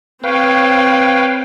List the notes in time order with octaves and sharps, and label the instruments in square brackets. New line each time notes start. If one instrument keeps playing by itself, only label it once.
[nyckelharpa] C4 C#5 [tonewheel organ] B4 F5 G5